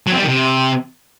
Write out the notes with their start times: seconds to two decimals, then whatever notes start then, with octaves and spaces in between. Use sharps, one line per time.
0.07 F#3
0.12 C4
0.17 G3
0.23 D#3
0.28 C3